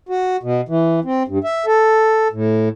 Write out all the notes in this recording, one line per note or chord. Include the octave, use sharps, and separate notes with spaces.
F#4
B2
E3
C4
G2
E5
A4
A2